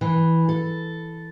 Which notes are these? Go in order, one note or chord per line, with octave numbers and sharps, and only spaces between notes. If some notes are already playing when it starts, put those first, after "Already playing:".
E3
A4